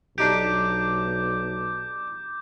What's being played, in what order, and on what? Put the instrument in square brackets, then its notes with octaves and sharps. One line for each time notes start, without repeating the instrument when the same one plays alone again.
[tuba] B1 [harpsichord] D4 D#4 G4 [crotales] D6 G6